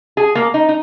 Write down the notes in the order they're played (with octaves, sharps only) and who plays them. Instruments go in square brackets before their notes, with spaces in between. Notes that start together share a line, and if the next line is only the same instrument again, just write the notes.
[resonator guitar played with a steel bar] G#4
A#3
D#4
D#4